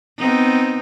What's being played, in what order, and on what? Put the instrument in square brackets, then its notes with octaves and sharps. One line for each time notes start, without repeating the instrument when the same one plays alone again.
[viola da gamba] B3 C4 D#4